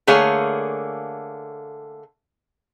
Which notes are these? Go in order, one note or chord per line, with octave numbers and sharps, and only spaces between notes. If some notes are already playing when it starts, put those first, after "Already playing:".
D3 A3 A#3 G#4 C#5 F5